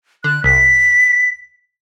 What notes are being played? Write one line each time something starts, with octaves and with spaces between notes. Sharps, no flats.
D3 F#6
C2 B6